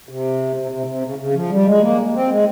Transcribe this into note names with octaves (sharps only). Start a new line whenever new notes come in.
C3
C3
C3
C3
C#3
C#3
F3
G3
G#3
A#3
C4
G#3